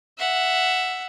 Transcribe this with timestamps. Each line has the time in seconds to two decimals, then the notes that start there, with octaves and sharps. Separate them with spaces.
0.19 E5 F#5